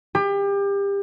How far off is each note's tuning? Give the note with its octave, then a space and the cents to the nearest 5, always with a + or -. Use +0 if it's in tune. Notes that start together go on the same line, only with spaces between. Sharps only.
G4 +30